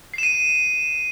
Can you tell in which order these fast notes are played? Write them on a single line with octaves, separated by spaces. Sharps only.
C7 E7 D#7